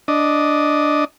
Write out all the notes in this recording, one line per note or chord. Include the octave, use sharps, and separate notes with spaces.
D4 D#5